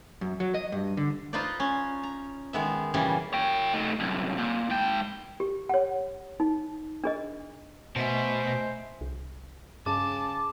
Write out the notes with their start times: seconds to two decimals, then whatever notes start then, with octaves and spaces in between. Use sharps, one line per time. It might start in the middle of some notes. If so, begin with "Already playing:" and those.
0.21 F#2
0.40 F#3
0.54 D#5
0.72 G2
0.97 D3
1.33 D#4 F4 B4 C5 D5
1.60 C#4
2.03 A#5
2.53 D#3 G#3 B3 E5
2.94 A#2 C#3 E3 G3
3.33 C#5 G5
3.74 A3 D#4
4.00 C2 F#2
4.38 A#2
4.70 G#2 G5
5.40 G4
5.69 C#5 F#5
6.40 D#4
7.04 D4 G#4 D#5
7.96 B2 A3 C5 D#5 E5 G#5
9.01 C2
9.86 G2 C#3 A5 D6